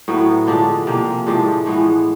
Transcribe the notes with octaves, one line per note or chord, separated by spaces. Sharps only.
A2 F#3 B3
D3 F3 G#3 D4
C3 F3 A#3
A2 F3 G#3 D4
A2 E3 G#3 B3